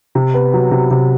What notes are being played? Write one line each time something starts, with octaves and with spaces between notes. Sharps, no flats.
C3
B3
F#3
C3
C3